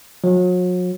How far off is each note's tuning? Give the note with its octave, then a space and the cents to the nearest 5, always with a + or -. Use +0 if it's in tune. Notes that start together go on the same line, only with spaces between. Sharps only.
F#3 -40